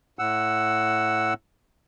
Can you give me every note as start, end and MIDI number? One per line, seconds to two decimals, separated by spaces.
0.19 1.34 45
0.19 1.34 78
0.19 1.34 88